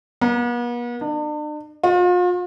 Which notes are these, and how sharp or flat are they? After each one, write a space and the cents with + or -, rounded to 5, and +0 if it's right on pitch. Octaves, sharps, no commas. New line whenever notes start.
B3 -45
D4 +40
F4 +40